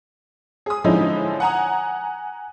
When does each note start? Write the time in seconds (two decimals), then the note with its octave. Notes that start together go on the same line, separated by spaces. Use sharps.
0.66 G#4 D#6
0.84 D3 F3 G#3 C#4 D#4 E4
1.40 F#5 G#5 A#5 D#6